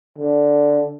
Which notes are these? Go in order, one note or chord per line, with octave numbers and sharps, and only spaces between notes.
D3